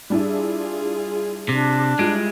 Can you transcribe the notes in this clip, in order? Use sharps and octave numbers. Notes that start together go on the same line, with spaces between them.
G3 D4 E4 F4 G#4
C3 D4
G3 G#3 E4 F4 D7